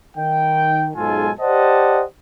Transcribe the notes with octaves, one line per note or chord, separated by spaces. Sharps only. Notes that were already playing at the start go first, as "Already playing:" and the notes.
D#3 G5
B1 G#2 G#3 F4 A4 G#5
G4 C5 D5 D#5 F#5 A5